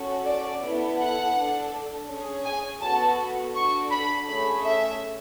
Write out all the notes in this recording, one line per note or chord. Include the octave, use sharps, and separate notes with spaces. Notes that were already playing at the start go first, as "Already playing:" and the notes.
Already playing: C#4 F#4 A4
D5
B3 E4 A4
F#5
D4 A4
C#4 G#4
G#5
B3 F#4 A4 A5
D4 F#4 A4 C#6
B5
A3 C#4 G#4 B5
E5